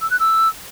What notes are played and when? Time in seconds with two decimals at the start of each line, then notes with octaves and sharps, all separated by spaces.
0.01 E6
0.11 F#6
0.20 E6